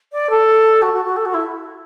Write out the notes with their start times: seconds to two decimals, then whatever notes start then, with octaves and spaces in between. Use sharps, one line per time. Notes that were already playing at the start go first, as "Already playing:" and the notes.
0.12 D5
0.30 A4
0.82 F#4
0.93 F#4
1.05 F#4
1.16 A4
1.25 F#4
1.34 E4